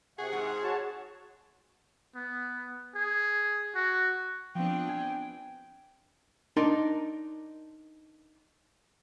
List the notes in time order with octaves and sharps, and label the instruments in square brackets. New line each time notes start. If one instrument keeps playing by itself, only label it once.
[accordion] C3 F#5 C#6 [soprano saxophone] G#4
[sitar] G#2
[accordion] F#4 C#5 A5
[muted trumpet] B3
G#4
F#4
[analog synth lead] F3 [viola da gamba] B3 C4 D4 [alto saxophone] G5
[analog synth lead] G#5
[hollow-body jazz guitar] D4 D#4 A#4 D5 C6